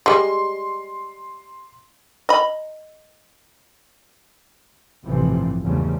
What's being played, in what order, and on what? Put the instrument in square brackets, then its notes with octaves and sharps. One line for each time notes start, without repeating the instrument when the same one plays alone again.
[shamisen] G3 G#3 [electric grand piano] C6
[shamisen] D#5 B5
[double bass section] A1 G2 C3 E3 F3 C4
E2 G#2 C#3 G3 A3